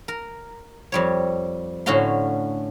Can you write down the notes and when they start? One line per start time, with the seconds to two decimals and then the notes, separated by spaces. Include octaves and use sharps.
0.08 A#4
0.92 F2 G3 C#5
1.86 A2 D3 C#4 F#4 F5 C6